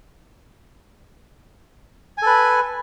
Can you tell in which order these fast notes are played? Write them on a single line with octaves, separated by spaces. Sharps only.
G#5 A4 B4